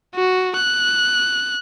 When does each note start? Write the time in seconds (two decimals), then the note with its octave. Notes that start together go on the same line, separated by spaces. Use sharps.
0.15 F#4
0.56 F#6